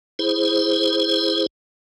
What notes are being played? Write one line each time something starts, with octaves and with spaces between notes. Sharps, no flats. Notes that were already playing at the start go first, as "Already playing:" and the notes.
E4 G#4 C5